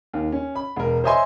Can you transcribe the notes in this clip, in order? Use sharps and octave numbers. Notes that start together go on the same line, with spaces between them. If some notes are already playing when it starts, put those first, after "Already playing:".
D#2
C#4
B5
E1 A#4
C5 C#5 D#5 E5 G#5 C6